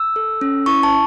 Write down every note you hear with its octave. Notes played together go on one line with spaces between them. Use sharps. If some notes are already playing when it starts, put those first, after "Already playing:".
Already playing: E6
A4
C#4
E4 C#6
A5